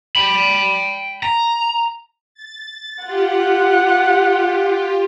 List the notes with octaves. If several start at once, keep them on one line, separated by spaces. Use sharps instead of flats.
G5 B5
A#5
A6
F4 G4 F#5